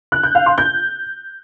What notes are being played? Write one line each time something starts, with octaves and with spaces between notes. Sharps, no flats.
F#6
G6
F5
C6
G6